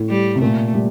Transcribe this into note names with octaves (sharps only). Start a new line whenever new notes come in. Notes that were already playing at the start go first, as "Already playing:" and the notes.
Already playing: A2
G3
C3
A#2 A3
G3